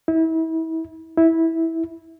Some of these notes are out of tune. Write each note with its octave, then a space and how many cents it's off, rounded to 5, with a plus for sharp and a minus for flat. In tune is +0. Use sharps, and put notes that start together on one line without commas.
E4 -35
E4 -15